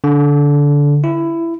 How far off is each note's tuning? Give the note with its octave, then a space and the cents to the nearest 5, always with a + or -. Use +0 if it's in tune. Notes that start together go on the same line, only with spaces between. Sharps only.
D3 -20
E4 +15